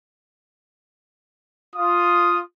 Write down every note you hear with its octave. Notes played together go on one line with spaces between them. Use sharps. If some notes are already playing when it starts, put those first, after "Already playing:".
F4 D#6